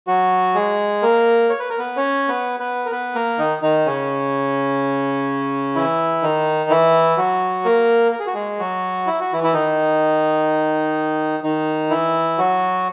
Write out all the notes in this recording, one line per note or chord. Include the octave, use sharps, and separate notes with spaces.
F#3 F#4
G#3 G#4
A#3 A#4
C#5
B4
A#4
B3 B4
C#4 C#5
B3 B4
B3 B4
A#4
B3 B4
A#3 A#4
D#3 D#4
D#3 D#4
C#3 C#4
E3 E4
D#3 D#4
E3 E4
F#3 F#4
A#3 A#4
A#4
G#4
F#4
G#3 G#4
F#3 F#4
E4
F#4
E3 E4
E4
D#3 D#4
D#3 D#4
E3 E4
F#3 F#4